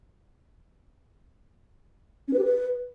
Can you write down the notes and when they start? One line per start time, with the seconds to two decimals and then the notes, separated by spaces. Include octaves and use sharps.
2.28 C#4
2.33 B4
2.39 G4
2.44 B4